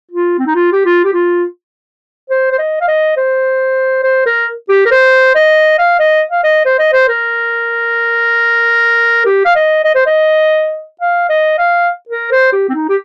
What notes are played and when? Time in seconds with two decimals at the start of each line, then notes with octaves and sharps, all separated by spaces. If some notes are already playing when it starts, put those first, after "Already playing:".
0.11 F4
0.39 C4
0.47 D#4
0.55 F4
0.72 G4
0.85 F4
1.04 G4
1.13 F4
2.30 C5
2.51 C5
2.59 D#5
2.81 F5
2.88 D#5
3.17 C5
4.03 C5
4.26 A#4
4.69 G4
4.86 A#4
4.91 C5
5.35 D#5
5.79 F5
6.00 D#5
6.31 F5
6.44 D#5
6.65 C5
6.79 D#5
6.92 C5
7.08 A#4
9.26 G4
9.45 F5
9.55 D#5
9.84 D#5
9.95 C5
10.07 D#5
11.01 F5
11.29 D#5
11.58 F5
12.09 A#4
12.32 C5
12.53 G4
12.69 C4
12.75 D#4
12.89 G4